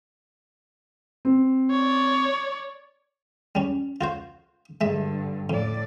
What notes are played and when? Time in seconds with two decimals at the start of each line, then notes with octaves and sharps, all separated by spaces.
1.25 C4
1.70 C#5 D5
3.55 G3 C#4
4.01 F4 F#4 C5
4.81 G2 D3 G#3 E5
5.50 F2 A2 D5